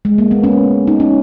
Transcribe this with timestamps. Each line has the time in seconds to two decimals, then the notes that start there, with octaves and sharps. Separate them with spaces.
0.05 G#3
0.18 A#3
0.31 B3
0.44 C#4
0.87 D#4
1.00 C#4